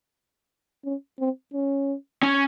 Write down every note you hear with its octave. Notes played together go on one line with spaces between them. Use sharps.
C#4
C4
C#4
C#4